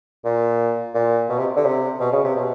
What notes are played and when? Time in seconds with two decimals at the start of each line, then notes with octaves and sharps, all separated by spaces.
0.24 A#2
0.94 A#2
1.29 B2
1.38 C3
1.56 D3
1.65 C3
2.00 B2
2.12 C#3
2.24 C3
2.36 B2